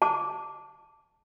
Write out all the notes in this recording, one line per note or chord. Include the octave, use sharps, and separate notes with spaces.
A5 D6